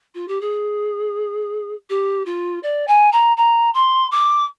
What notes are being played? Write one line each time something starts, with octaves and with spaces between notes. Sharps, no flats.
F4
G4
G#4
G4
F4
D5
G#5
A#5
A#5
C6
D6